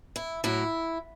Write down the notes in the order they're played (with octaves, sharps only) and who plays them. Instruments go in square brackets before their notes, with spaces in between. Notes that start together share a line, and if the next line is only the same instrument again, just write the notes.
[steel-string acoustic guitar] E4
A2 F#3 E4